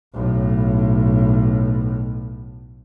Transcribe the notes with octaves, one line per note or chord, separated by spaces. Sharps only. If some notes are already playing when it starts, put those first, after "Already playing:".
B1 A2